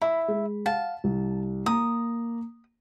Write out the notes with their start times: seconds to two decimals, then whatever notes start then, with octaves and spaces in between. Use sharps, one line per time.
0.02 E4 B5
0.28 G#3
0.66 F5 F#5 A5
1.04 C2
1.66 A#3 A#5 D#6